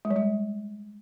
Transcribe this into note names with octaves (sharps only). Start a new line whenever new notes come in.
G#3
G3
G#3